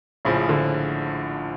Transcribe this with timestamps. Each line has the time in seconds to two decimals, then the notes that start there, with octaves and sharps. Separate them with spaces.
0.25 A#1 A2 C#3 F3
0.49 D3